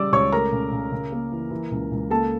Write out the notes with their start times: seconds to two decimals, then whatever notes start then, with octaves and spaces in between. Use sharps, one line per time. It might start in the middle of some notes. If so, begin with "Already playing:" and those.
Already playing: C#3 G3 D5 D6 E6
0.12 C#2 C#5 C#6
0.32 A3 A#4 A#5
0.53 C#3
0.72 C#3
0.92 C#3
1.12 A#3
1.32 E3
1.51 E3
1.71 C#2
1.92 C#2
2.11 A#3 A4 A5